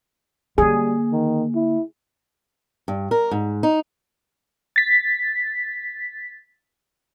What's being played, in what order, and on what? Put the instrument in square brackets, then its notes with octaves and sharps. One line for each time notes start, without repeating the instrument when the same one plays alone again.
[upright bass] D3 A#3 [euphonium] G3 [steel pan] G#4
[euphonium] D#3
E4
[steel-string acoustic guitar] G2
A#4
G#2
D#4
[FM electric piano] A6 B6